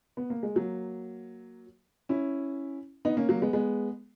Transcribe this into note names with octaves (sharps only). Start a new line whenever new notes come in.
B3
A#3
G#3
F#3 A#3
C#4 E4
B3 D#4
A#3 C#4
F#3 A#3
G#3 B3
G#3 B3